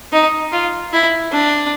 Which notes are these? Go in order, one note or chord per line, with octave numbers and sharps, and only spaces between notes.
D#4
F4
E4
D4